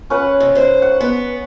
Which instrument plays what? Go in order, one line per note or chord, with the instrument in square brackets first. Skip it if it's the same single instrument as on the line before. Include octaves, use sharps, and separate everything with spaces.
[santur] C#4 B4 F#5
[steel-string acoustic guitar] C3
G#2 C5
[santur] F#5
[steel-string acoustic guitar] B3